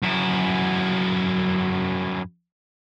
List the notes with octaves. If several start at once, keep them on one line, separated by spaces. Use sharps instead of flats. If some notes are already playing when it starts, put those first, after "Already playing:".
F#2 E4